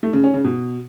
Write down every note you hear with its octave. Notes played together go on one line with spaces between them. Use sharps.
A3
C#3
C#4
C#3
B2